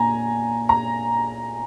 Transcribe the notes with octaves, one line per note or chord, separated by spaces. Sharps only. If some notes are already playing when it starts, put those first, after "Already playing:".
Already playing: A#2 A#3 G#5 A#5
A#5